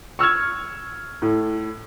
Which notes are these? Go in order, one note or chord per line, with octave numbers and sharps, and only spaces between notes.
C#6 E6 F6 G#6
A2